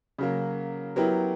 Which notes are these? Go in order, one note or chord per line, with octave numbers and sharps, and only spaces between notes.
C#3 F#3 A#3
F#3 B3 E4 G4 A#4